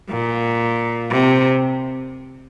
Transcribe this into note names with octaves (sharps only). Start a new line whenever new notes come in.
A#2
C3